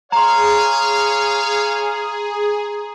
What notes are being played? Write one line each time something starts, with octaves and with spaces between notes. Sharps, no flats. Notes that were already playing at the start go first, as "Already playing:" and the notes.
G#4 C#5 F5 A#5 C6